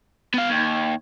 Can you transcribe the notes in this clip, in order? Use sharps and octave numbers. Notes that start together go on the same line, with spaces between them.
B3 F5
D#2